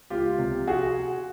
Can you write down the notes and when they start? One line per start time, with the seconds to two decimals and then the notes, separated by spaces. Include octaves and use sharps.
0.10 C#2 F4 G4
0.39 C3 F3
0.67 F#4 G#4